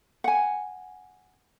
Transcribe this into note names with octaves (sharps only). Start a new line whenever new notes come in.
F#5 G#5